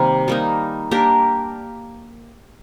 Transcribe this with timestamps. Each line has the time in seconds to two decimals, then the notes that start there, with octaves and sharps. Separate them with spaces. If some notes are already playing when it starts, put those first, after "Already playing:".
Already playing: C3 D#3 G3 A#3
0.28 G3 A#3 D#4
0.91 A#3 D4 G4 A#4